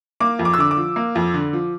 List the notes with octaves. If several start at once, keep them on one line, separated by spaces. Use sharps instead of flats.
A#3 D6
F2
D6
E6
D3 D6
D6
F3
A#3
F2
D3
F3